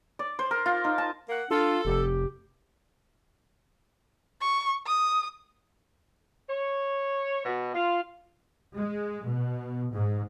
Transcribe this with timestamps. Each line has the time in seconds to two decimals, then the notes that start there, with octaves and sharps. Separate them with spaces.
0.19 D5
0.39 C5
0.51 A#4
0.66 F4
0.84 D#4
0.98 A5
1.29 A#3 F#5
1.51 D4 F4 A4
1.85 F1 G4
4.41 C#6
4.86 D#6
6.50 C#5
7.45 B2
7.74 F4
8.77 G#3
9.27 B2
9.94 G#2